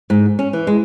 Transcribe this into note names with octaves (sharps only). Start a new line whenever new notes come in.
G#2
C#4
E3
G#3